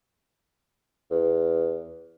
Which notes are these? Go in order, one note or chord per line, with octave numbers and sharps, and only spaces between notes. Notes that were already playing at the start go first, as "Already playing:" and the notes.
E2